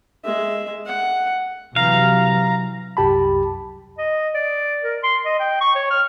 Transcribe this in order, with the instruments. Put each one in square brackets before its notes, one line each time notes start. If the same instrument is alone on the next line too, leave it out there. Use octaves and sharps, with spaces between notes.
[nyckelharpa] G#3 E5
F#5
[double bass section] C3 E3 F#3 [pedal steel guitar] F5 [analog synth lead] A#5
[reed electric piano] C2 F#2 G4 A5 B5
[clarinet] D#5
D5
A#4
C6
D#5
G5
C#6
C#5
F6